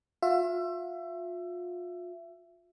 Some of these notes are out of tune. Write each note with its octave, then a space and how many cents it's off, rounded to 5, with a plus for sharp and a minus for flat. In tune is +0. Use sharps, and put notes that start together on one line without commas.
F4 +35 E5 +25